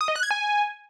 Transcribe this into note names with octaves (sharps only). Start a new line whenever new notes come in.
D#6
D#5
F#6
G#6
G#5